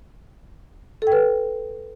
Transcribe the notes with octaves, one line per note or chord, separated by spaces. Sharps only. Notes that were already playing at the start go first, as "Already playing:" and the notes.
A4 B4 G5